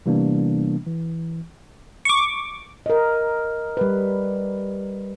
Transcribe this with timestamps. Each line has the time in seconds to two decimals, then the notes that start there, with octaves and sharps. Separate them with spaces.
0.06 C3 E3 G3 A#3 B3 D4
0.87 E3
2.05 C#6 D6
2.86 A#4 D#5
3.77 G3 B4